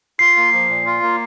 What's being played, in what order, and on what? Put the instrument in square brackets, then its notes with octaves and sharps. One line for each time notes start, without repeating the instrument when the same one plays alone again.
[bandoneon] F4 [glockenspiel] C7
[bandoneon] A#3
F3
A#2
F4
A#3